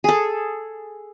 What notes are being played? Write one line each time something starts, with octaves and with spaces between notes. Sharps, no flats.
G#4 A4